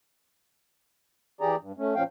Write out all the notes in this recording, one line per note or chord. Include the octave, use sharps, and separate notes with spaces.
E3 G4 G#4 D5 A#5
G2
A3 C#4
A#2 F3 C#4 F5 G5